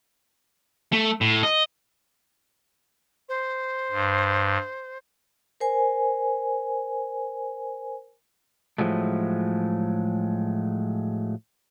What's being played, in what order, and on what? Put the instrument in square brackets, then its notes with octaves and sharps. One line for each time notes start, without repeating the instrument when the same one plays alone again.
[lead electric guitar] A3
A2
D#5
[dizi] C5
[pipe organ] G2
[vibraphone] A#4 C5 G#5
[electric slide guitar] A2 F3 F#3 G#3 A3